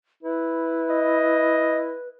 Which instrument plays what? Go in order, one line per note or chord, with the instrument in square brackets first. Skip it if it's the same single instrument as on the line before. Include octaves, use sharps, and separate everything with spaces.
[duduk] E4 [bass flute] B4
[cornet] D#5